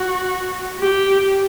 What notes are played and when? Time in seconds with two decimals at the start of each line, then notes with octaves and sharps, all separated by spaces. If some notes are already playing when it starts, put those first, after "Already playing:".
Already playing: F#4
0.79 G4